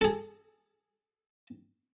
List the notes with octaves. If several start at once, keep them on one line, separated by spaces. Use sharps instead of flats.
G#4 A4